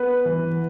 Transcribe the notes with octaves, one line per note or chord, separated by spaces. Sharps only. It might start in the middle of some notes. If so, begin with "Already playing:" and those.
Already playing: B3 B4
E3